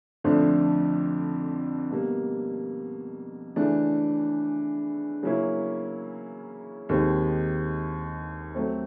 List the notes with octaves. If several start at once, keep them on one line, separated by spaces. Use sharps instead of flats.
F2 D3 F3 A3 D4
B2 G3 A#3
C#3 E3 A3 D4
C#3 F#3 A#3 C#4 E4
D#2 D#3 G#3 C4
F#3 A3 C4